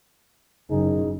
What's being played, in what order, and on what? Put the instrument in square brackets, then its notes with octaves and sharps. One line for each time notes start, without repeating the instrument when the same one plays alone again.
[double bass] F#1 [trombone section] D#4 G#4